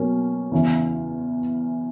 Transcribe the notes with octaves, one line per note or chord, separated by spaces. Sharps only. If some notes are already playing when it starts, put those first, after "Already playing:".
Already playing: B2 F#3 A#3 C#4
E2 C#3 E3